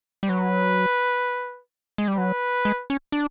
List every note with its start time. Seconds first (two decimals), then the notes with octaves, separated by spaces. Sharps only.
0.23 G3
0.29 F#3 B4
1.98 G#3
2.08 G3
2.18 F#3 B4
2.65 G#3
2.90 C#4
3.12 D4